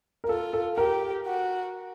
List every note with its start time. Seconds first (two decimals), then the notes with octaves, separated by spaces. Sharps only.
0.24 A#4
0.28 F4 A4
0.53 A4
0.77 G4 A#4
1.27 F#4